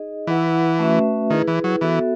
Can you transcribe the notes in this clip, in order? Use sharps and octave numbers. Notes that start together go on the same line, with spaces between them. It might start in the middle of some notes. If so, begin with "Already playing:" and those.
Already playing: D#4 G#4 D#5
E3 E4 B4 F#5
A3 C#4 F#4 B4 E5
D#3 E4 G#4 B4
E3
F#3
E3 B3 F#4 A4 E5